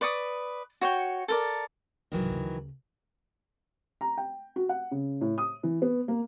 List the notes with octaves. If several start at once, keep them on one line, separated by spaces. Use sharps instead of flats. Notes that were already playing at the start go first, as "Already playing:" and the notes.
B4 D5 C#6 D#6
F#4 C#5 G5
A4 A#4 D5
C2 G#2 D#3 E3 F#3
D2 C#3
A#5
G5
F#4
F#5
C#3
A2
D#6
E3
B3
A#3